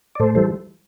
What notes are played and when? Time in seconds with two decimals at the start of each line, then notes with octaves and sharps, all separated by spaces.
0.15 D5
0.19 A2 A4 C5
0.35 E3 G3 A4 C5